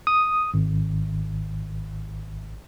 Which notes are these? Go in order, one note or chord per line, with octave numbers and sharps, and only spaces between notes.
D#6
G#1